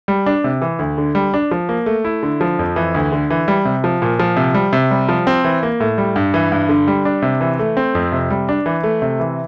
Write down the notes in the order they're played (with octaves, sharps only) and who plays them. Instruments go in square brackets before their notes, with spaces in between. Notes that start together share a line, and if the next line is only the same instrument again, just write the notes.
[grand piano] G3
D4
C3
E3
D2
D3
G3
D4
F3
A#3
A3
E4
D3
F3
F2
E3
D2
D3
E3
G3
C3
F3
A#2
F3
C3
G3
C3
G3
F3
C4
E3
A#3
A2
G3
G2
E3
G2
D3
G3
D4
C3
E3
A3
C4
F2
C3
G3
D4
E3
A3
C3
E3